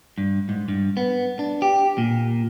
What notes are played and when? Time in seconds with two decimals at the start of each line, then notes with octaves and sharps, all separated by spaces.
0.18 G2
0.49 G#2
0.68 G2
0.97 B3
1.39 D4
1.62 G4
1.98 A#2